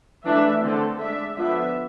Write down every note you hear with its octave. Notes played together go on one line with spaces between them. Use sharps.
E3 A3 D4 E5
D3 A3 C4 A4
G#3 D4 E5
D3 F3 B3 D4 E5